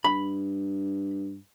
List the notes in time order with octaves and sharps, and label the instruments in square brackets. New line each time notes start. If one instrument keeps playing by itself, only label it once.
[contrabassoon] G2 [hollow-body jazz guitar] B5